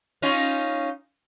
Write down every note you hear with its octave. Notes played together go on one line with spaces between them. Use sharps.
C#4 D#4 F4